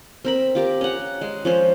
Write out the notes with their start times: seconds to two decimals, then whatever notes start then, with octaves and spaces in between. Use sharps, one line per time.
0.25 C4 A#4 B5
0.55 F4 G4 A#4
0.81 C#4 F#5
1.21 G#3
1.45 F3 C#4 C5